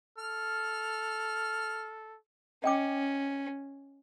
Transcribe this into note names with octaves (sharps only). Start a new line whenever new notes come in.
A4 F6
C#4 D#5 G5 D6